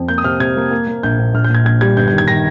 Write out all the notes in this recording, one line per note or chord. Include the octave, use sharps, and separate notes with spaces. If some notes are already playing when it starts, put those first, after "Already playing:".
Already playing: F2
A#3 G6
D#6
C3 F6
C3 G#6
A#3
A#3
A#3
A#1 G6
A#1
A#1 F6
G6
A#2 G#6
A#1 G#6
G3 G#6
G1 G6
G6
D#3
G#6
D#3 A#6